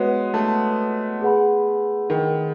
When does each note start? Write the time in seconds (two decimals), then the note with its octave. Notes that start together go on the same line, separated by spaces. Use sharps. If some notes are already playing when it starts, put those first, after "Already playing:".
Already playing: G#3 B3 F#4 C#5 F#5
0.34 A3
1.21 G#4 B4 F#5 B5
2.10 D#3